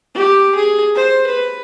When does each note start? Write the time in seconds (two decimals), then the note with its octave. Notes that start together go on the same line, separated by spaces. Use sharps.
0.15 G4
0.55 G#4
0.95 C5
1.26 B4